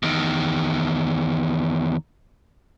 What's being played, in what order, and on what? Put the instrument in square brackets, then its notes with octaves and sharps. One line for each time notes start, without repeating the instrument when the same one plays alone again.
[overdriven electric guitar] E2 D#3